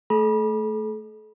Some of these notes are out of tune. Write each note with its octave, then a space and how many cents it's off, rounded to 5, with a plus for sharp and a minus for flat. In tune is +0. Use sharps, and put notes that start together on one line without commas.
A3 +0 A4 -40 B5 -35